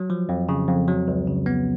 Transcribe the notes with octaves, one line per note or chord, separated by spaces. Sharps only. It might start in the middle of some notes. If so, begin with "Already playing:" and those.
Already playing: F#3
F3
F2
C#3
F2
F#3
C#2
C#3
B3